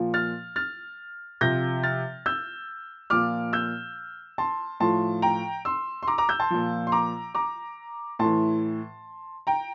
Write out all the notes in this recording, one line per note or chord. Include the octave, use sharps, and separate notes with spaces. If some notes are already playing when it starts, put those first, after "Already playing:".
Already playing: A#2 F3
F6 A6
F6 A6
C3 F3 G6 A#6
F6 A6
E6 G6
A#2 F3 D6 F6
E6 G6
A5 C6
A2 F3 A5 C6
G5 A#5
C6 E6
C6
A#5 D6
A#5 D6
E6 G6
A5 C6
A#2 F3
C6
A#5 D6
A#5 D6
A2 E3 A5 C6
G5 A#5